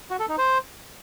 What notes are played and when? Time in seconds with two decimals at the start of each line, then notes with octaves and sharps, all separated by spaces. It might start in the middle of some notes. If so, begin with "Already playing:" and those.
0.10 F#4
0.20 A4
0.29 D#4
0.38 C5